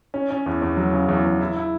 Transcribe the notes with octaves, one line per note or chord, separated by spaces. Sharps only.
C#4
C#4
E2
E2
F#3
C#3
E2
E2
E4
E4